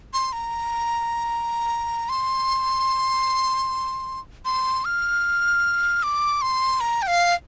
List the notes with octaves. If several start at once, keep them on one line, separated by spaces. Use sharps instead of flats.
C6
A#5
C6
C6
F6
D6
C6
A#5
G5
F5